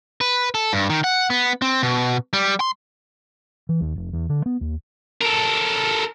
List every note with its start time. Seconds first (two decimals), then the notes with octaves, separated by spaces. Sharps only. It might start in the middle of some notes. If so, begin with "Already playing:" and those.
0.21 B4
0.55 A4
0.73 G2
0.90 D#3
1.04 F#5
1.30 B3
1.62 C4
1.83 B2
2.33 G3
2.60 C6
3.69 E3
3.81 D#2
3.96 F1
4.13 E2
4.29 D3
4.46 B3
4.61 D#2
5.21 A4 A#4